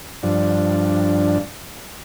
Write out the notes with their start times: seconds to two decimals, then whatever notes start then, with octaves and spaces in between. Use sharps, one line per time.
0.23 G2 F3 D4